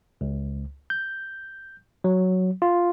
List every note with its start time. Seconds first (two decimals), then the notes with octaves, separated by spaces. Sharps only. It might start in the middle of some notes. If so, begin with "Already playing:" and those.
0.21 C#2
0.90 G6
2.04 F#3
2.62 F4